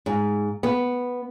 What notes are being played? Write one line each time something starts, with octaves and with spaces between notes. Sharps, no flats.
G#2
B3